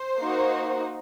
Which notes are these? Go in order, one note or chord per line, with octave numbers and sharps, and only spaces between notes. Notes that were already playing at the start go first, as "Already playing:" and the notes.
Already playing: C5
A#3 D#4 F#4